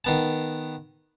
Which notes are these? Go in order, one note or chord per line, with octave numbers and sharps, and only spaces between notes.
D#3 B3 A5